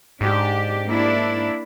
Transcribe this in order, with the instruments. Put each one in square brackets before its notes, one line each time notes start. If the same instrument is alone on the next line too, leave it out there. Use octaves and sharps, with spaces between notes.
[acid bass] G#2 [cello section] D4 G4
[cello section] A#3 D4 E4